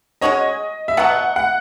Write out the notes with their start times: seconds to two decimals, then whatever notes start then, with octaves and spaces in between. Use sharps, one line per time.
0.21 G#3 C#4 F#4 C#5 D#5
0.88 E5
0.97 B2 F#3 B3 F#5
1.36 F#5